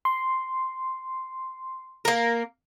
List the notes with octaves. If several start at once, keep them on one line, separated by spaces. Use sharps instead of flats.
C6
A#3 A#4